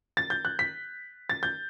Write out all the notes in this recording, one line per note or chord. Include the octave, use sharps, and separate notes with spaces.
A6
G6
F#6
B6
A6
G6